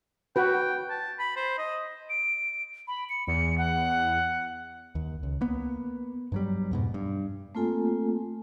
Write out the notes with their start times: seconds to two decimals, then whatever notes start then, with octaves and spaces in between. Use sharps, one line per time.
0.36 F#4 B4 G5
0.90 A5
1.19 B5
1.37 C5
1.58 D#5
2.10 D7
2.88 B5
3.09 C#7
3.27 E2 C#7
3.58 F#5
4.95 D#2
5.23 C#2
5.41 A#3 B3
6.32 G2 F#3 G3
6.71 F2 G#2 B2
6.94 G2
7.55 A3 A#3 C4 F4 A4 G#5